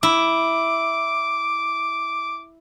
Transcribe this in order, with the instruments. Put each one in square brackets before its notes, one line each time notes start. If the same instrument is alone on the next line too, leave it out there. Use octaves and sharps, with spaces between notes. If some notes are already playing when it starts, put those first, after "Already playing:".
[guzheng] E4 [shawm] D6